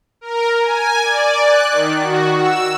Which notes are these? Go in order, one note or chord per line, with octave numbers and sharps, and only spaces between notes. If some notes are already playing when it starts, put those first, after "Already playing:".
A#4
G#5
D5
F#6
D#3
F#4
E6